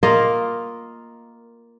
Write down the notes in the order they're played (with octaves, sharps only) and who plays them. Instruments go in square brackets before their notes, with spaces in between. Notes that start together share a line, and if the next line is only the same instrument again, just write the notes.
[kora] A#3 F4 A#4 D#5